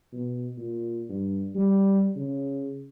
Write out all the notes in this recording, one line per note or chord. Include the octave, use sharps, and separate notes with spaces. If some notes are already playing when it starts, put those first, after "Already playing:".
B2
A#2
G2
G3
C#3